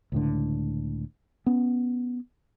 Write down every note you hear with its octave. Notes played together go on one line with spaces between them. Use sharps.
C#2 A2 D3
B3 C#4